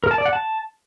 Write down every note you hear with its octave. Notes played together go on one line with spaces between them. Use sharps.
A#4
A5
D5
F#5
A5